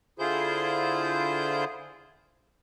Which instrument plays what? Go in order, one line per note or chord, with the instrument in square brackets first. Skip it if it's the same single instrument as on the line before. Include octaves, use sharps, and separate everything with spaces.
[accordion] D3 E4 F4 G#4 C5 G6